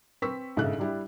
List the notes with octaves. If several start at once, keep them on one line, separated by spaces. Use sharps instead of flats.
C4 B4 C#6 E6 B6
G1 G#2 C#3 A4 E5 F#6
G3 D4 E4 G4